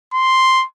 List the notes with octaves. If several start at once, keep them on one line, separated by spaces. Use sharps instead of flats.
C6